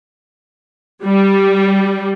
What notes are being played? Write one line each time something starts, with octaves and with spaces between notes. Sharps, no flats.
G3